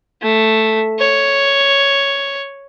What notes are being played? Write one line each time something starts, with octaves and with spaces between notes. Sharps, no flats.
A3
C#5